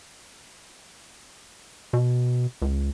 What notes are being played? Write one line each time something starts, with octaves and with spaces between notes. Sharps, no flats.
B2
C#2